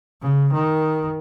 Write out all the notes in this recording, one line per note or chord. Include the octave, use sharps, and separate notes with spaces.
C#3
D#3